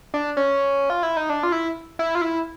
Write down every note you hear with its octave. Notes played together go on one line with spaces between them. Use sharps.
D4
C#4
F4
E4
D#4
D4
F4
E4
E4
F4
E4